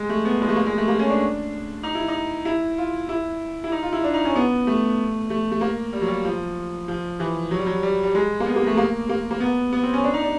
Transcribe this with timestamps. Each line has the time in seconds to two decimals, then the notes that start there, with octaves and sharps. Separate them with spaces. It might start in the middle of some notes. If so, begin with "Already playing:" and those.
Already playing: G#3
0.09 A3
0.25 B3
0.42 G#3
0.48 A3
0.56 A#3
0.67 G#3
0.78 A3
0.88 A#3
0.99 C#4
1.09 D4
1.83 D#4
1.95 E4
2.08 D#4
2.45 E4
2.78 F4
3.09 E4
3.64 E4
3.72 D#4
3.83 F4
3.93 E4
4.04 D4
4.14 D#4
4.25 C#4
4.36 B3
4.67 A3
5.30 A3
5.52 A3
5.61 A#3
5.93 G3
6.02 F#3
6.08 G3
6.25 F3
6.88 F3
7.20 E3
7.51 F#3
7.59 G3
7.66 F#3
7.83 G3
8.03 G3
8.15 G#3
8.40 A#3
8.46 B3
8.56 A#3
8.67 A3
8.77 A#3
9.09 A#3
9.31 A#3
9.40 B3
9.73 B3
9.83 C4
9.93 C#4
10.04 D4
10.14 D#4
10.22 D4